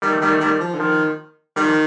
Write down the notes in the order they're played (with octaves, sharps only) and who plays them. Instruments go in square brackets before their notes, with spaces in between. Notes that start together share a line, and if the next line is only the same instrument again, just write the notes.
[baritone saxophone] D#3 [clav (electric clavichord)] G3
[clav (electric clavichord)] A3
[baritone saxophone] D#3 [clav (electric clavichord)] G3
[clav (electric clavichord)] A3
[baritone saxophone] D#3 [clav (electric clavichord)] G3
[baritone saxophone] F3
D3
[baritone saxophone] D#3 [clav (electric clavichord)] F3
[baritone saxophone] D#3 [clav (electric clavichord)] G3
[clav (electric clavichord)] F3